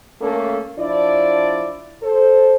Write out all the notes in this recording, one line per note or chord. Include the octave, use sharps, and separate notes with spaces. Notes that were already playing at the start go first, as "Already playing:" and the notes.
A3 A#3 C#4 A4
F3 D4 E4 D5
A4 C5